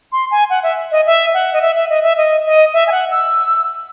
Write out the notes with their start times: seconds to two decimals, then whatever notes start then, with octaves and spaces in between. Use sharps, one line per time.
0.12 C6
0.31 G#5
0.50 F#5
0.63 E5
0.92 D#5
1.06 E5
1.34 F#5
1.53 D#5
1.62 E5
1.75 E5
1.90 D#5
2.03 E5
2.18 D#5
2.46 D#5
2.73 E5
2.87 G#5
2.92 F#5
3.11 E6